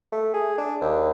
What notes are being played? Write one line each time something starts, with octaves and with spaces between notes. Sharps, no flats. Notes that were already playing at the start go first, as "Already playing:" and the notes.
A3
G#4
D4
D#2